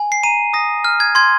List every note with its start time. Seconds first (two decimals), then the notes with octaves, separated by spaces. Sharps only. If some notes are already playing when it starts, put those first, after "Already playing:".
Already playing: G#5
0.12 C7
0.23 A#5 D#7
0.53 D#6 A#6
0.84 F6
1.00 G#6
1.15 C6 G#6